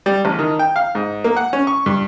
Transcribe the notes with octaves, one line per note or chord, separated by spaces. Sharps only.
G3
A1
D#3
G5
F5
G#2
A#3
F#5
C#4
C#6
G2